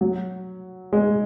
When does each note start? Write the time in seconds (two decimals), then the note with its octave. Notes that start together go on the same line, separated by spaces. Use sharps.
0.01 F#3
0.93 G#3